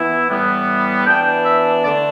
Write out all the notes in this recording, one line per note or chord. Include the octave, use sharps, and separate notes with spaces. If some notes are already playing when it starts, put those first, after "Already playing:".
Already playing: E3 B3 E4
A2 E3 G3 B3
E3 B3 D4 G5
E5
D3 A3 D4 D5